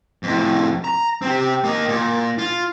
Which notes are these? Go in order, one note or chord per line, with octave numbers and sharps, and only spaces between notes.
F2 A2
A#5
C4 G4
A#3 D#5
A#2
F4